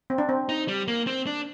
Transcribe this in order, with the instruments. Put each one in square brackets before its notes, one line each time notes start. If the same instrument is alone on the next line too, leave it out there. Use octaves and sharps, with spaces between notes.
[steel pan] C4
D4
C4
[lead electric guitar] D#4
G3
A#3
C4
D4